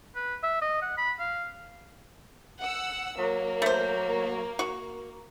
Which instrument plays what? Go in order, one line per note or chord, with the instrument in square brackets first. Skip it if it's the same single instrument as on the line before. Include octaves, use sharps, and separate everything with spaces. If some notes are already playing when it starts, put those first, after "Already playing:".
[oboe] B4
E5
D#5
F#5
B5
F5
[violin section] F#5 E6
[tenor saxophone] F#3 [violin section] A#3
[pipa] A3 C5
F#4